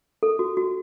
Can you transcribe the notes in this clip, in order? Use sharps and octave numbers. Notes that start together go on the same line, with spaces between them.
A4
F#4
F#4